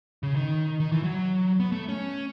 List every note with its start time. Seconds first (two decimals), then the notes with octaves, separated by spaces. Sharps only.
0.23 C#3
0.35 D#3
0.80 D#3
0.92 E3
1.03 F#3
1.60 B3
1.72 A3
1.89 C#4